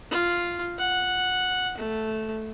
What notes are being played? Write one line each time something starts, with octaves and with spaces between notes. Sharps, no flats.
F4
F#5
A3